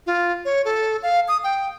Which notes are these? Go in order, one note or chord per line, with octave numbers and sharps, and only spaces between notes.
F4
C#5
A4
F5
D#6
G5